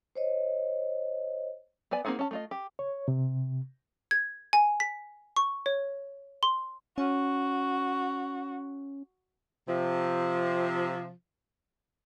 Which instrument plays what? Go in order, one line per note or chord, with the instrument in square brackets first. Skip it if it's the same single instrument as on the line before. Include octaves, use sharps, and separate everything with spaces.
[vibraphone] C5 C#5 D#5
[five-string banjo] B3 B4 D5 G#5
A#3 C4 D#4 G#4 F#5
C#4 A5
A3 F4 D#5
G4
[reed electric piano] C#5
C3
[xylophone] G#6
G#5
B6
C#6
C#5
C6
[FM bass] C#4 [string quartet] F#4
[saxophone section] C3 F3